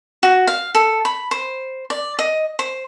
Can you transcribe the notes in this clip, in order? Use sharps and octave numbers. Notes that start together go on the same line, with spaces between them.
F#4
F5
A4
B5
C5
D5
D#5
C5